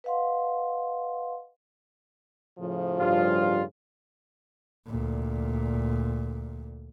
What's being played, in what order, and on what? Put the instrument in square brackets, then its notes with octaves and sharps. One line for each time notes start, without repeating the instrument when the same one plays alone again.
[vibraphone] B4 D#5 F5 F#5 C6
[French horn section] A2 C#3 F3
[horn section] G2 G3 F4
[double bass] D2 A#2